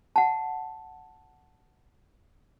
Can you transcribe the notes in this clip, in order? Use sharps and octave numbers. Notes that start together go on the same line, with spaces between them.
F#5 A5